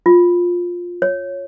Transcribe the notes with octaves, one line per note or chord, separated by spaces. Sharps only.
F4
C#5